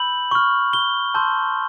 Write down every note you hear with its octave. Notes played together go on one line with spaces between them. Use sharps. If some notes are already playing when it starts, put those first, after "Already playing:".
Already playing: B5 E6 G6 F#7
C#6 F6
G7
A5 C6 E6 G6